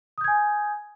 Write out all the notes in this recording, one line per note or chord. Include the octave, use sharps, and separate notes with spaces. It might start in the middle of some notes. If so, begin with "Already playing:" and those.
G#5 D#6 G6 G#6